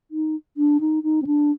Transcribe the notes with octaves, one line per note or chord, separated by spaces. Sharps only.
D#4
D4
D#4
D#4
C4
D4